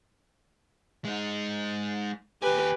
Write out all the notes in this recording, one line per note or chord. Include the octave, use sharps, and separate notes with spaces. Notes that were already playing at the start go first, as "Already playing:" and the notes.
G#3 D#4
D#2 G4 B4 G#5